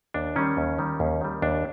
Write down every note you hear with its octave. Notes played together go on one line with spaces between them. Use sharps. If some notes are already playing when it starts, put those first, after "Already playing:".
D#2 D4
D#3 G3 C#4
D#2
D#3 G3
D#2
D#3 G3
D#2 D4